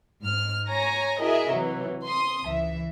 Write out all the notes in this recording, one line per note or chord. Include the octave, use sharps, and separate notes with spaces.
G#2 F6
C#5 G#5 A#5 A#6
E4 F#4 G#4 A#4 D#5 E5
C3 E3 F#3
C6 D#6
C#2 E3 E5